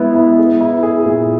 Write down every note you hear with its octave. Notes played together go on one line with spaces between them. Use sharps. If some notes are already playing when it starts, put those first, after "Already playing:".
Already playing: G#3 B3 E4
E4
G#4
E4
G#4
A#2